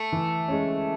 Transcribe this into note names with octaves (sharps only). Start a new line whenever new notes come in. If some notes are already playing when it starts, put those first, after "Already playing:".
Already playing: A3
E3
G#3 C#4